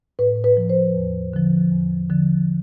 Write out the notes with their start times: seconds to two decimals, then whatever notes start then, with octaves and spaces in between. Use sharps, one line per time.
0.19 A2 B4
0.44 B4
0.57 F3
0.70 C5
0.95 E2
1.34 D3 F3
1.71 E2
2.10 D3 F3